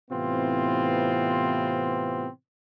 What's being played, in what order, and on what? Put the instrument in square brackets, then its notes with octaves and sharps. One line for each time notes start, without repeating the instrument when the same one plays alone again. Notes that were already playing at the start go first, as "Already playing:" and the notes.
[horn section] A2 C3 E3 B3 C4 F4